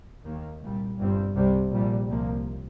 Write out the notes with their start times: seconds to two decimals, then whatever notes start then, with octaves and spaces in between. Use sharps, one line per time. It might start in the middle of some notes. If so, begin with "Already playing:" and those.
0.25 D#2 D#3 A#3
0.61 C2 A#2 G3
0.98 G1 G2 G3 C4
1.35 C2 C3 G3
1.72 A#1 A#2 G3
2.08 C2 C3 F3 A#3